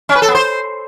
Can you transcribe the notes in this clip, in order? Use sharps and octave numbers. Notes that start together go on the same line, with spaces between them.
C#4
B4
A4
B3
C5